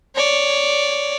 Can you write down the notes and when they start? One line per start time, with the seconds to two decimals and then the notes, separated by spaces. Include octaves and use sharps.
0.15 C#5 D5